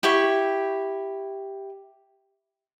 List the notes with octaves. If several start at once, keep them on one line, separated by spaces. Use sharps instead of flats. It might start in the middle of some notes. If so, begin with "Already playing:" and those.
E4 G4 G5 C#6